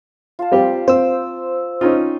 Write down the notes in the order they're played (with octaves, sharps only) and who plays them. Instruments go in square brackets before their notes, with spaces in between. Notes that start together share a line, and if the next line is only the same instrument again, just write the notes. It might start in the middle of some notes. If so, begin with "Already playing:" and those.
[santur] F4 F5 A5
[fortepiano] G3 C4 G4
[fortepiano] C4 [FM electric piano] C5 E6
[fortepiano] C#4 D#4 F4 [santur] G5